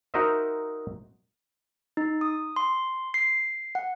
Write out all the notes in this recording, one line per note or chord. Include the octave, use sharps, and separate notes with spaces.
D#4 F#4 A#4 C5 D#5 E5
D#4
D#6
C6
C7
F#5